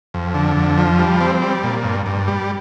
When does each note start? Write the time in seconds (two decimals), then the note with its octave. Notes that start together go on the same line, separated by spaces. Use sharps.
0.14 F2
0.34 D3
0.56 F2
0.78 F3
0.99 G3
1.21 C4
1.42 G3
1.63 A#2
1.84 G2
2.06 G2
2.28 G3